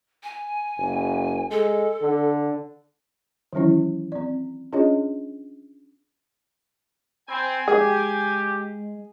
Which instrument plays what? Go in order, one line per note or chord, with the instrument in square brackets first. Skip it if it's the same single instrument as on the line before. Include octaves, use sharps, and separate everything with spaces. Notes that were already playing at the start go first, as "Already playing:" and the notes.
[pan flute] G#5
[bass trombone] F#1
[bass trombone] G#3 [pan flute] A4
[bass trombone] D3
[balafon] D#3 E3 F#3 C#4 E4
C4 D5
C#4 D4 F4 G#4 C#5 D#5
[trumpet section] C4 [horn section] G#5 [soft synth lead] B5
[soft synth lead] G#3 [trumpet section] G4 [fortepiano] G#4